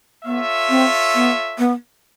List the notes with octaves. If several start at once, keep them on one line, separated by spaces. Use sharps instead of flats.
B3 F4 A4 C#5 E5
C4
B3
B3